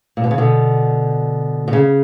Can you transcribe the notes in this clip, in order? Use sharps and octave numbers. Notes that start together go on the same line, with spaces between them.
A#2
B2
C#3
B2 D3
B2
C#3